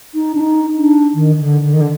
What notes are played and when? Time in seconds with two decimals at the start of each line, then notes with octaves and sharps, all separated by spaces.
0.14 D#4
0.35 D4
0.39 D#4
0.78 D4
1.14 D#3
1.40 D3
1.64 D3
1.73 D#3
1.81 D3